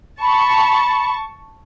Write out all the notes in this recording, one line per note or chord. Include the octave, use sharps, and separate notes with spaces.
A5 B5 C#6